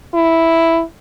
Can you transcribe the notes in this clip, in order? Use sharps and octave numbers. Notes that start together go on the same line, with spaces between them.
E4